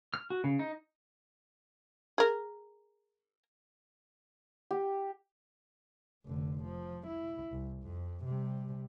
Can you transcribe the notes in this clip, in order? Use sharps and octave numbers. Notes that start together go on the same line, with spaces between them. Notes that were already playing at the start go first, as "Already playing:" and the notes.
F6
F#4
C#3
D#4
G#4 A#4
G4
F1 D3
F3
E4
C2
F2
C3 G3